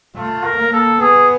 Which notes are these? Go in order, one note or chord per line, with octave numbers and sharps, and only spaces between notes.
A3 F4
A#4
A#3
A4
B3 G#4